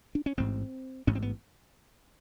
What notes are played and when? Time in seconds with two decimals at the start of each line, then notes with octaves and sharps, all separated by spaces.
0.15 D4
0.26 C#4
0.37 A1 G#2 C4
1.07 A1 G#2 C#4
1.15 C4
1.22 B3